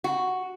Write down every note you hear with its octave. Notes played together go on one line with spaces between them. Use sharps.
F#4